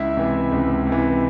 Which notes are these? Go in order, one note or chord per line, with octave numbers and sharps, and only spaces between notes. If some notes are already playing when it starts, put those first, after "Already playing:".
Already playing: C#2 E4 E5
C3 E3
C#2
C3
E3